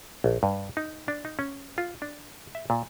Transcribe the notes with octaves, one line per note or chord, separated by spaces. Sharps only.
A#1
G2
D#4
D4
D#4
C#4
F4
D4
E5
A#2